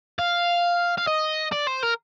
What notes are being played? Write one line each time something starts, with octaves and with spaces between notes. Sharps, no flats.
F5
F5
D#5
D5
C5
A#4